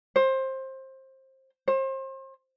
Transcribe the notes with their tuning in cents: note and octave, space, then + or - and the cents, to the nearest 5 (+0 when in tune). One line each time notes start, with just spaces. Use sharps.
C5 +20
C5 +35